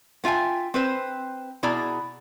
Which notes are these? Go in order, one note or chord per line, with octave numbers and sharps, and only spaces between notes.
B3 F4 E5 G5 G#5
C4 B4 C5
B2 E4 G#4 D5 A#5